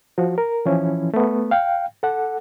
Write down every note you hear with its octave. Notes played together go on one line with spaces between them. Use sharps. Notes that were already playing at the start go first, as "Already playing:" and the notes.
F3 F#4
A#4
E3 F3 C#4 E4
A3 B3
F5 G5
A4 F#5